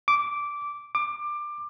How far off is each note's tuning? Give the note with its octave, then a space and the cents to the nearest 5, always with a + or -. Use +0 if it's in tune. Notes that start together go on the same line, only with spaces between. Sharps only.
D6 -10
D6 +20